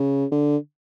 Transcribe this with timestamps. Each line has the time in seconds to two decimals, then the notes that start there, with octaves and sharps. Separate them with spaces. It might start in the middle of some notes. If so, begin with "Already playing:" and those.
Already playing: C#3
0.32 D3